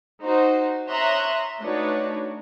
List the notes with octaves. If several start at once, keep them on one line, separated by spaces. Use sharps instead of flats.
D#4 F#4 C5
C#5 E5 A#5 C6 D#6 F#6
A3 D4 D#4 F#4 B4 C#5